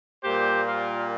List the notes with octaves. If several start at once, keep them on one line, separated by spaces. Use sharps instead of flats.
A#2 G3 A#3 G4 C5
F4 A#4